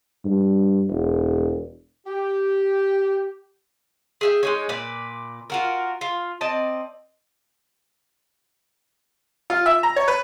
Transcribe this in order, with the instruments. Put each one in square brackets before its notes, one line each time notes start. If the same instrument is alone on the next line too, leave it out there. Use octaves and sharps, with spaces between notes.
[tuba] G2
E1
[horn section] G4
[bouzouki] G#4 E5 G5
G#3 D#4 C#5
A#2 B4 D5
F4 F#4 A#4
F4
C4 D5 D#5 A5
[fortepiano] F4
E5
A#5
C#5
B4